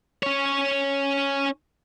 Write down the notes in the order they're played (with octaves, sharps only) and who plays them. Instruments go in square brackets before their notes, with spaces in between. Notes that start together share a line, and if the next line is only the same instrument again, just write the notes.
[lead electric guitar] C#4 C#5